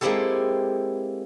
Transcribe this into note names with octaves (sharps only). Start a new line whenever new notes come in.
G#3 A#3 C4 E4 G4 A4